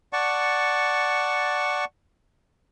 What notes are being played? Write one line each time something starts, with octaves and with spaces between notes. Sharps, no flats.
D5 F#5 A5 C#6